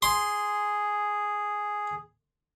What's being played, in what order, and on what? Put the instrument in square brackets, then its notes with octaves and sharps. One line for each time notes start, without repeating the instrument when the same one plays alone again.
[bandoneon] G#4 [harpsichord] C6